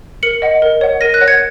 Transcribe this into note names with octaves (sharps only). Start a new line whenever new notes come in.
A#4 C#7 F#7
D#5 F#5
A#4
C#5 F#5
A#4 A#6 D#7
F#6 A#6
C#5 F#5
G#6 C#7